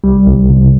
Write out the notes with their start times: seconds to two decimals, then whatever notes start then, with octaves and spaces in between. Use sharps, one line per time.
0.04 C2 G3
0.27 C2
0.50 C3